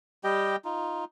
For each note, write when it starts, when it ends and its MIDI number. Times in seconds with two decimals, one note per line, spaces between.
0.24 0.56 55
0.24 0.56 67
0.24 0.56 75
0.24 0.56 79
0.65 1.05 63
0.65 1.05 65